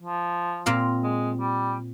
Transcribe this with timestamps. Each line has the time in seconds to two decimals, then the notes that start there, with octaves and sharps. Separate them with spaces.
0.02 F3
0.66 A#2 C4 F5
1.03 G#3
1.40 G3